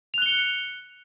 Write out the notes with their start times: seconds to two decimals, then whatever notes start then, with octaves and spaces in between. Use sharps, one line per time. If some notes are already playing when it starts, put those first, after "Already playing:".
0.14 F7
0.18 F#6
0.22 G7
0.26 C#7